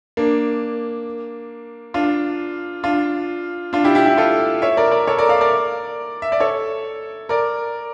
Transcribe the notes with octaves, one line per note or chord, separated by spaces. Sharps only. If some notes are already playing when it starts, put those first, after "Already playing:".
A#3 D4
D4 F4
D4 F4
D4 F4
E4 G4
E4 G4
E4 G4
F4 A4
C#5 E5
A#4 D5
A#4 D5
A4 C#5
A#4 D5
D5 F5
A#4 D5
E5
D5
A4 C#5
A#4 D5